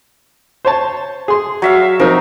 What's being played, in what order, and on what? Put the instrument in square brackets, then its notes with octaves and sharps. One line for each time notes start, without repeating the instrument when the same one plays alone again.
[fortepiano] C5 C#5 A5
G#4 C6
[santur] F#3 E5 F5
[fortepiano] F3 C4 D#4 [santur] A#4